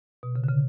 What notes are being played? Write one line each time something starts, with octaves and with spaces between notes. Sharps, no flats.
B2
C#3
D3
C#3